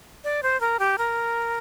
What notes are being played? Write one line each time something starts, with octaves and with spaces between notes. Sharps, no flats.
D5
C5
A#4
G4
A#4